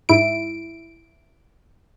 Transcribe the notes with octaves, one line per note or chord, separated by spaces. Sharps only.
G#2 E4 D7